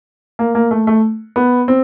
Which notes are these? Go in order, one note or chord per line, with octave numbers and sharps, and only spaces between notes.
A#3
A#3
A3
A3
B3
C4